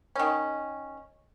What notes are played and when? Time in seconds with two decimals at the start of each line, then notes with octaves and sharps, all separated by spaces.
0.16 D#3 C#4